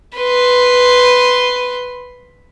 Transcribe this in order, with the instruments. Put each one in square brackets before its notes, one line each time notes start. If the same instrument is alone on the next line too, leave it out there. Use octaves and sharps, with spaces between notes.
[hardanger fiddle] B4 C6